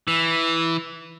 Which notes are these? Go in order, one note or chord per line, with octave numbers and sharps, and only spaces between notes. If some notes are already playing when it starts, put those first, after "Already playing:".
E3